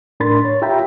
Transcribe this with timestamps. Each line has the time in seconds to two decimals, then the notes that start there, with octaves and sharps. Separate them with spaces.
0.20 A2 D4 A#4 B5 C6 A6
0.45 C#5
0.62 F4 G4 E5 G5 A#5 B5